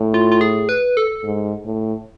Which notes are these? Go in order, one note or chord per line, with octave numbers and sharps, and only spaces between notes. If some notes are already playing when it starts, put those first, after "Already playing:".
Already playing: A2
F4
F4
G#4
B4
A4
G#2
A2